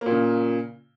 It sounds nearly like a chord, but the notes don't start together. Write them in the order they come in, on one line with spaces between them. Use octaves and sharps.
A#3 A#2 C#3